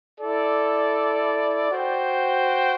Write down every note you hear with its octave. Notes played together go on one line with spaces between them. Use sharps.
E4 A4 D5
F#4 C5 G5